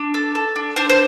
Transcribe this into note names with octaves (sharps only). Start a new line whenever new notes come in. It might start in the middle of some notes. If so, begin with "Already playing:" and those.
Already playing: D4
A4
A4
D4
D4 C5
C5